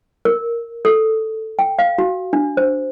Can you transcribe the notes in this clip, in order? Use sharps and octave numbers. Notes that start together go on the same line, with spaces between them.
A#4
A4
G5
F5
F#4
D4
C5